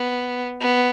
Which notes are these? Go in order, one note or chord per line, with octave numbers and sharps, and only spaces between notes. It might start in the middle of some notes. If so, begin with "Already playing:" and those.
Already playing: B3
B3